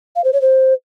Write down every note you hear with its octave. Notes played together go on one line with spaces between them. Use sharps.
F5
C5
C#5
C5